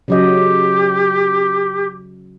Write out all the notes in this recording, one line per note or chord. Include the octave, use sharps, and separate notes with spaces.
C#3 F#3 G4 D#5